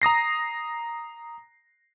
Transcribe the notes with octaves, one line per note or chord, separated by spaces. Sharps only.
A#5 D#6 A#6 C7